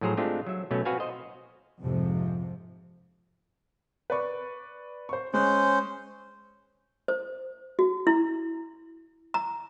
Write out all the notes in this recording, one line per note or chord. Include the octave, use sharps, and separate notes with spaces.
A2 F3 F#3 G#4 C5 A#5
G#3 A3 C4 D4 F4 G4
F#3 E5
B2 F#3 A3 C#4
C4 F#4 B4 F5 G#5
C5 D#5
F2 G#2 C3 F3
B4 D5 C#6
C5 C#6
G#3 C#4 C5 F#6
C5
F#4
E4
A#5